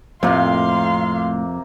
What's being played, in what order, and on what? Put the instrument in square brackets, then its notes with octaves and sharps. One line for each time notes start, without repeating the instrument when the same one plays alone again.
[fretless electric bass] F2 [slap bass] A2 A3 [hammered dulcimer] C3 A#3 [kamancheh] F5 C6